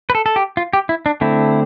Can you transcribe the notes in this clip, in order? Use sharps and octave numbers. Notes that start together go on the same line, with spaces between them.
B4
A4
A4
G4
F4
G4
E4
D4
D3 A3 C4 E4